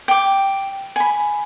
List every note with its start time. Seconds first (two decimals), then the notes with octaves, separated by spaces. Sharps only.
0.08 G5 D6
0.96 G#5 B5